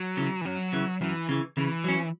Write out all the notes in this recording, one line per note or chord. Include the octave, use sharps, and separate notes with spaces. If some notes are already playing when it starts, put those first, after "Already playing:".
Already playing: F#3
C#3 E3
E3
F#2 F#3
C#3 E3
F#2 E3
C#3 E3
C#3 E3
F#3 C#4